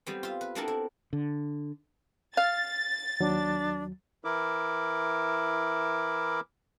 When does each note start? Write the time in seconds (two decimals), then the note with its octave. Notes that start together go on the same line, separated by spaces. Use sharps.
0.06 G3 B3 C4
0.23 F4 E5
0.41 B4
0.55 B3 C4 D4 E4 A4 A#4
0.68 E4
1.13 D3
2.37 F5 A6
3.20 D#2 F#3 D4
4.25 E3 E4 A#4 D6